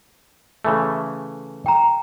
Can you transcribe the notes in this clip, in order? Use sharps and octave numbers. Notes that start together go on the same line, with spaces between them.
C#3 E3 A3
G5 A#5